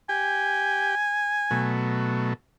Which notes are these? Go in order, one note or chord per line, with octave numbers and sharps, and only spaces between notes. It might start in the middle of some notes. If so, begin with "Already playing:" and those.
G4 G5 G#5
B2 F#3 A3